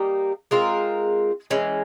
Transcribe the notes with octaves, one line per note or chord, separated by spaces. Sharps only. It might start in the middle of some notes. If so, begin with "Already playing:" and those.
Already playing: G3 A#3 D#4
G#3 C4 F4 A#4
E3 G#3 C#4